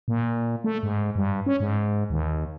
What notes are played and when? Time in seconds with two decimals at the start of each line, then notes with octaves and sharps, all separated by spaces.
0.08 A#2
0.64 A3
0.83 G#2
1.16 G2
1.46 C#4
1.60 G#2
2.10 D#2